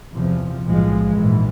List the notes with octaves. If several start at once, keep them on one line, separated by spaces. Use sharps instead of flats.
E2 C3 F3
B1 A2 F3 G#3
A#1 G#2 E3